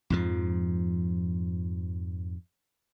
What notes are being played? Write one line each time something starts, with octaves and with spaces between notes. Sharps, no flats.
F2 G#2 F3